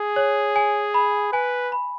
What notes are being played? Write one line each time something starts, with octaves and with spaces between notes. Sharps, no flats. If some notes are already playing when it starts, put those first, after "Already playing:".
Already playing: G#4
C#5
G#5
B5
B4 G#5
B5